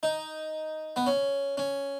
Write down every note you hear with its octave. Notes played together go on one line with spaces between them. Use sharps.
D#4
B3
C#4
C#4